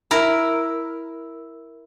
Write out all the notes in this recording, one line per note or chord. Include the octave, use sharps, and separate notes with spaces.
E4 A#4